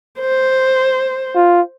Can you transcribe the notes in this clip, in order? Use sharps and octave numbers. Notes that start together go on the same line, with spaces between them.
C5
F4